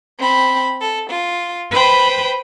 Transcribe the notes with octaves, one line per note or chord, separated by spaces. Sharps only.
C4 B5
A4
F4
B4 C5 G5 B5